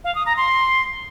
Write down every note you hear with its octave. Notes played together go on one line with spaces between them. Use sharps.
F5
D#6
A#5
C6